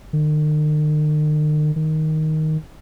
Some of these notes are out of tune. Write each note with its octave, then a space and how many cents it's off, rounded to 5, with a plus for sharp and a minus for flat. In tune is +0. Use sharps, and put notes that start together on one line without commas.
D#3 -45
D#3 +5